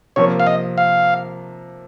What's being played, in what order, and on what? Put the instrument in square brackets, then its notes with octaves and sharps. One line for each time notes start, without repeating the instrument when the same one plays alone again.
[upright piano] C3 F3 A#3 [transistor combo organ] C#5
[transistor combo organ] F5
D#5
F5